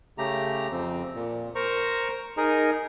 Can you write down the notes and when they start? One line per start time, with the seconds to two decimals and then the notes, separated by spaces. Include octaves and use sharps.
0.18 C#3 A3 G4 A#5
0.71 F2 C4
1.14 A#2
1.55 A#4 C5 A#5 C#6
2.37 D#4 G#4 A#4